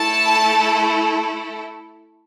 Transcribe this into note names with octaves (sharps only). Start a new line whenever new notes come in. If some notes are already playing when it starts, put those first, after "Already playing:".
Already playing: A3 E4 A4 A5